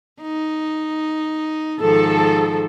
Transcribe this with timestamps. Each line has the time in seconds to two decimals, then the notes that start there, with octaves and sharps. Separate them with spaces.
0.21 D#4
1.80 G#2 D#3 F3 A4